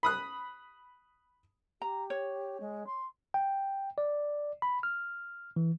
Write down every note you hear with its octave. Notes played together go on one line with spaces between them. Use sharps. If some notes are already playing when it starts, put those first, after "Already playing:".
B5 D#6 F#6
G4 A#5
C#5
G#3
C6
G5
D5
B5
F6
E3